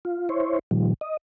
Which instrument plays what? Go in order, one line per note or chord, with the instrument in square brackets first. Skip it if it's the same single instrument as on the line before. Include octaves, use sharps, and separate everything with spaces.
[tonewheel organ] F4
E4 C5 C#5
A#2 D#3 F3 G3
D#5